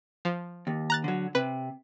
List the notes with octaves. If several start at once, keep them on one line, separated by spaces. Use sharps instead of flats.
F3
D#2
A#5 F#6 A6
D3 F#3
C3 B4